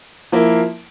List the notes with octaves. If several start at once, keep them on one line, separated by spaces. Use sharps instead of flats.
F3 A#3 E4